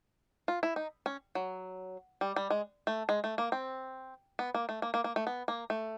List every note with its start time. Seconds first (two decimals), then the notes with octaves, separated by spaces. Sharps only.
0.48 F4
0.63 E4
0.76 D#4
1.06 C#4
1.35 F#3
2.21 G3
2.36 G3
2.50 G#3
2.87 A3
3.09 G#3
3.24 A3
3.38 A#3
3.52 C4
4.39 B3
4.54 A#3
4.69 A3
4.82 A#3
4.94 A#3
5.04 A#3
5.16 A3
5.27 B3
5.48 A#3
5.70 A3